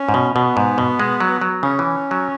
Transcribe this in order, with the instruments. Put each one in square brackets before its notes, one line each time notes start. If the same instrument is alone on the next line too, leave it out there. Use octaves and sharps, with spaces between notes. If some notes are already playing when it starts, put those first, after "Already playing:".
Already playing: [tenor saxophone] C#4
[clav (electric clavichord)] G#2
B2
[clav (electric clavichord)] B2 [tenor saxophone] B3
[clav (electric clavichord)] G#2
B2
G#3
F#3
F#3
[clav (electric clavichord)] C#3 [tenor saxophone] C#4
[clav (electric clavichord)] E3
F#3